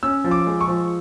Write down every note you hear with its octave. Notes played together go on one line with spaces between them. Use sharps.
C#4 E6
F3
D6
G#3
C#6
F3